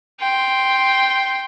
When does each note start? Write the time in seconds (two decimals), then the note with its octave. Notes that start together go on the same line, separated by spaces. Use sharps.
0.20 G5 C6